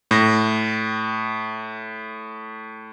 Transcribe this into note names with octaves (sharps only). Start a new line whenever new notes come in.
A2 A#6